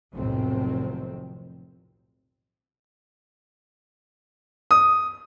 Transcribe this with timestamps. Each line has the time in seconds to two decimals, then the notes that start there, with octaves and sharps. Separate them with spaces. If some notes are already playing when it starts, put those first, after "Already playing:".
0.14 F1 B1 A2 D#3 C4
4.71 D#6